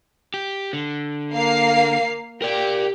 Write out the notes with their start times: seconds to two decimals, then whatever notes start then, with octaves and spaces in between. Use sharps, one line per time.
0.34 G4
0.73 D3
1.33 A#3 F5 C7
2.42 G4 A#4 D5